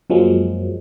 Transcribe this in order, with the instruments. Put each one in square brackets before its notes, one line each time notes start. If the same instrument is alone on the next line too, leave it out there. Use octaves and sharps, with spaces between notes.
[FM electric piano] F#2 F3 F#3 G#3 A#3